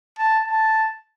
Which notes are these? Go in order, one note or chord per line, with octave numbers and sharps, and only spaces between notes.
A5
A5